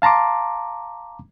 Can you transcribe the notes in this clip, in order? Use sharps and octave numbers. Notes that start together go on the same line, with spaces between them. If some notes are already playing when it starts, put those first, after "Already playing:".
F5 A5 A#5 C6 D6